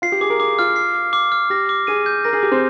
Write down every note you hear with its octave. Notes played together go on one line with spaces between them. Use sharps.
F4 C7
G4
G#4 D6
A#4
G#4 D6
F4 F6
C7
D6
D6
F6
G4 A#6
D6
G#4 D#7
G6
A#4 A#6
G#4
G4 D6
C4